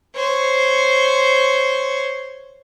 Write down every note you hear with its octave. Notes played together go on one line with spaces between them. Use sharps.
C5 C#5